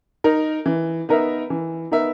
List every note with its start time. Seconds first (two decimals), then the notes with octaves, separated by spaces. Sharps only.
0.24 D#4 A#4
0.66 E3
1.09 B3 D#4 A#4 E5
1.50 E3
1.92 B3 D#4 A#4 E5